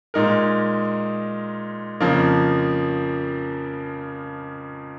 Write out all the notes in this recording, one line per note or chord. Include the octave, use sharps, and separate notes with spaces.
A#2 G#3 D#4 A#4
F2 C#3 F3 A#3